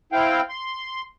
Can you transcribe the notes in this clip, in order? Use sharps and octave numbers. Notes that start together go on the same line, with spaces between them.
C4 E4 F5 G5
C6